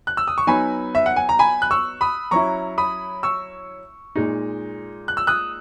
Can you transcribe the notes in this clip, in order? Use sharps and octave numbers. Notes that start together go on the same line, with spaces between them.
F#6
E6
D#6
C#6
F#3 B3 D#4 G#5 B5
E5
F#5
G#5
A#5
G#5 B5
F#6
C#6 E6
B5 D#6
F#3 C#4 E4 A#5 C#6
B5 D#6
C#6 E6
A#2 G#3 D#4
F#6
E6
D#6 F#6